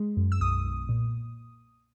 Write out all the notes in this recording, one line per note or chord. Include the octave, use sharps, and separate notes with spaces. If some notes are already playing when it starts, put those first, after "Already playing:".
Already playing: G#3
F#2
E6
B1 D#6
B1
A#2